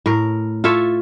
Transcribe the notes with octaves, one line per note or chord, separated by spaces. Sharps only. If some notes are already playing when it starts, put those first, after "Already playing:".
A2 A#4
F4 A4 C#5 E5